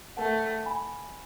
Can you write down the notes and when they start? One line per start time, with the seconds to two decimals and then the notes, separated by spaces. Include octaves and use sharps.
0.17 A3 F#5 A5
0.66 G#5 B5